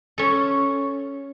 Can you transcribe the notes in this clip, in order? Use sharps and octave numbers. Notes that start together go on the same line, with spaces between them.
C#4 A4